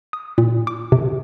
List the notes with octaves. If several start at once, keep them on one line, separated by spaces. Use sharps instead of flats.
D#6
A#2
D6
C3